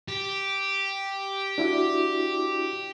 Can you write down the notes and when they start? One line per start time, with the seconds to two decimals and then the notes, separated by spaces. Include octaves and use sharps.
0.09 G4
1.58 D4 E4 F#4